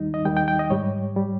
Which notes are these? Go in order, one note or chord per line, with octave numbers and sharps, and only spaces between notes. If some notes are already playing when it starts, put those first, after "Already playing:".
Already playing: D#2 D#3 G3 D#4
D#5
D#2 D#3 G3 G5
G5
G5
D#5
G#2 G3 C#5
G3